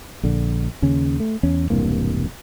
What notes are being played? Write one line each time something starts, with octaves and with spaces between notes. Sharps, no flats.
A#1 D3
D#2 C#3 C#4
A3
E2 C#4
E1 C2 G2 A#3